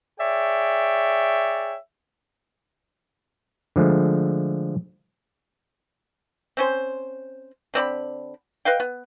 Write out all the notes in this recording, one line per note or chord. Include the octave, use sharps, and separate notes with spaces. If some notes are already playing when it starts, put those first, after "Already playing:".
G#4 C#5 D5 E5 G5
D3 F3 G#3 A3
C4 C#4 C5
D3 C4 D5 B5
B4 D#5 F5 G5
B3